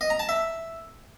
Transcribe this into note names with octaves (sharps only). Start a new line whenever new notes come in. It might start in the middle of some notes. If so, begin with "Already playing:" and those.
D#5
A#5
A5
E5